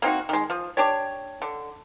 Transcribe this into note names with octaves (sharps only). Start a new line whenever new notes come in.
A#3 C4 D#4 F#4
D#3 G#3
F3
D4 G4 C#5
D3